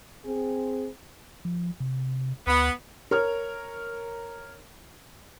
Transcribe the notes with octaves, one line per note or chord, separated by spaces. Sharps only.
C4 G#4
F3
C3
D2 B3
A#4 C#5 F6